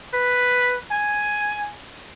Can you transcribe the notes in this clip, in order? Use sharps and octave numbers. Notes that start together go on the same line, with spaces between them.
B4
G#5